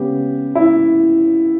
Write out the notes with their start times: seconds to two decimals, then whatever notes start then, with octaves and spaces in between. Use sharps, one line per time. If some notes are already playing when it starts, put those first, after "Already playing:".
Already playing: C#3 G#3 B3 G4
0.55 E4